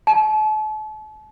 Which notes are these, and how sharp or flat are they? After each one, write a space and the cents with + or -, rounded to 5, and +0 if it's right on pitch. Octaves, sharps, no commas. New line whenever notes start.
A5 -40